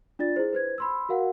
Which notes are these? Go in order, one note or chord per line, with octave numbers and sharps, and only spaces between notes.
D4 F4 D5 A6
E4 G#4 C5
B4 C5 G#6
B5 C6 E6
F#4 A#4 F5 F#5